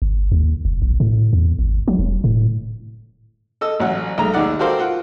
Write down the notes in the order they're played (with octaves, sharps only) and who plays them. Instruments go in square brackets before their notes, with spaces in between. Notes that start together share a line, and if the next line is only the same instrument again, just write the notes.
[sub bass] G1
D#2
F1
A#1
A2
E2
G#1
F#3
E1
A2
[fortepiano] A4 D#5 E6
A1 F#3 E5 F#5
B1 G#3 A3 A#5
D#2 D#3 D#4 D5 F#5
F#4 G4 A4 A#4 C5 F5
F4 F#5